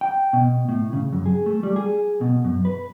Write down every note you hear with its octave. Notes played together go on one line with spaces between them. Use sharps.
G5
B2
A2
C#3
F#2
G#4
A3
G3
G#4
B2
F#2
B4